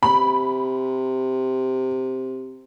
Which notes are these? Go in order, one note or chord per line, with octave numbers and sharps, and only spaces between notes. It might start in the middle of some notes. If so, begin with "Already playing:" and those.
C3 B5